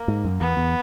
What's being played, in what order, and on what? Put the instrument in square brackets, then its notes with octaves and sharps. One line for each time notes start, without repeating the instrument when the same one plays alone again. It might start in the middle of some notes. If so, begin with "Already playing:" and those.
Already playing: [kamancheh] A#3
[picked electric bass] G#2
F#2
[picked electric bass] E2 [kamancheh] B3
[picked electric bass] E2